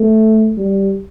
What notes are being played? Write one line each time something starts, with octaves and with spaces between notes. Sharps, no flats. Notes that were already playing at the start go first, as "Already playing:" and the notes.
Already playing: A3
G3